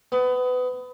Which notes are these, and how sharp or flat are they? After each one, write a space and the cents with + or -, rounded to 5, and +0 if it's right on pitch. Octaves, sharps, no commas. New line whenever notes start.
B3 +25